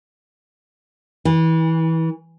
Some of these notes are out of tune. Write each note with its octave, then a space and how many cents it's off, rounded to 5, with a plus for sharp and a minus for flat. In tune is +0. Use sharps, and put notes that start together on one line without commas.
E3 -25